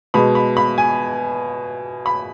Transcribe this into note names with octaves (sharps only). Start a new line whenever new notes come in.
B2 G#3 B5
B5
B5
G#5
B5